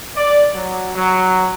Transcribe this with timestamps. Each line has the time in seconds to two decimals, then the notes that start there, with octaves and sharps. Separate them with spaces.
0.16 D5
0.55 F#3
0.95 F#3